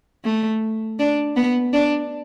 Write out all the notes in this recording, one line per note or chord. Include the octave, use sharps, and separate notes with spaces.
A3
D4
B3
D4